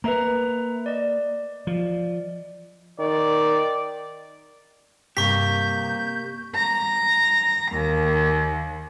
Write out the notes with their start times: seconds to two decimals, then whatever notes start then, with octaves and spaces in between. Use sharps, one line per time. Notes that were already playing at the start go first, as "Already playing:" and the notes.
0.04 A#3 B4 E5 A#5
0.86 D5 D#5
1.67 F3
3.00 D#3 D5
5.17 G2 C3 A#3 G4 C#6 G6 B6
6.56 A#5
7.73 D#2